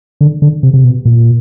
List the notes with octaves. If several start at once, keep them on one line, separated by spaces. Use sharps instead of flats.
D3
D3
C3
C3
B2
A#2